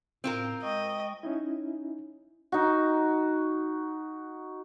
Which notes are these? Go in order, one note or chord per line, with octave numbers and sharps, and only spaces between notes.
A2 C4 F4 A#4
G#3 D#5 G5 C#6
C#4 D#4 E4
D#4 F#4